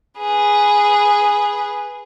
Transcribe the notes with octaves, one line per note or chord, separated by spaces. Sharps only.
G#4 B4